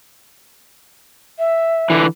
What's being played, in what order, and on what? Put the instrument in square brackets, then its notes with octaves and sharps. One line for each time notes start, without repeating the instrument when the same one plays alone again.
[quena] E5
[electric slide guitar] D3 E3